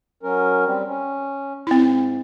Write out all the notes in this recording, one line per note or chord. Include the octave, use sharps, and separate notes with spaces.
F#3 C#4 A#4
G3 C4
C#4
G#2 C4 E4